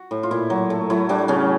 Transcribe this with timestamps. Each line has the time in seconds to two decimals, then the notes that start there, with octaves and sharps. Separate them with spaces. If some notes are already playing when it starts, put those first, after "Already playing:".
Already playing: F#4
0.11 A2
0.23 F4
0.31 A#2 E4
0.50 F#3
0.70 A3
0.90 F#3 E4
1.09 F#3 D4
1.28 C#3 C#4